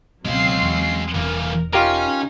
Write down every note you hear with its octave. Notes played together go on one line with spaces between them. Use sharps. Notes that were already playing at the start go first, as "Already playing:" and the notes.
C#2 B2 F#3 G#3 C4 F5 C7
E2
E1 E3 A#3 A#4
C#4 D#4 F4 G4 A#4